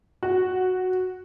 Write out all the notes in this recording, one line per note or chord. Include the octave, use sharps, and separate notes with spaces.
F#4